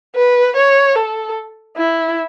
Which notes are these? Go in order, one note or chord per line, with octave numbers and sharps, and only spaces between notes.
B4
C#5
A4
E4